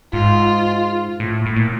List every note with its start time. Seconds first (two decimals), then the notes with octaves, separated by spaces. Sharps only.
0.13 G#2 F4
1.20 A2
1.46 A2
1.56 A#2